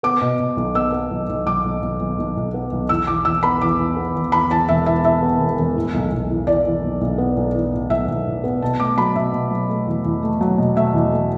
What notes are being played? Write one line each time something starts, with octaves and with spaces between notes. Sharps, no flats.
B3 D6
B2
B2
B1
B3 E6
B3
B1
B1
B1 D6
B1
B1
B1
B1
B1
B3
B1
E2 E6
E3 D6
E2 E6
B3 B5
E2 D6
E2
B3
E2
E2 B5
E2 A5
E1 E5
E3 E5
E3 E5
B3
E1
E1
A2
B1
B1
E3
E3 D5
E3
B1
B1
B3
B1
E3
A2
B1 E5
B1
A2
B3
B2 A5
A3 D6
F#3 B5
B2 E5
B2
F#3
A3
E2
E2
A3
F#3
B2
A3 E5
E2
A3